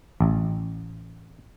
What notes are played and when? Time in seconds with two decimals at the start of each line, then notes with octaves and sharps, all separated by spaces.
0.21 A1